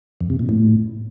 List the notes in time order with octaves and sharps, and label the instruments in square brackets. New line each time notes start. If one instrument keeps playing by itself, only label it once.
[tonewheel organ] F2
C3
A#2
A2